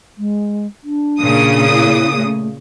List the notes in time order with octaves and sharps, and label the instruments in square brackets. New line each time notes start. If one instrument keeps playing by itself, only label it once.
[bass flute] G#3
D4
[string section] A#2 C#3 D#6
[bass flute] E4
A3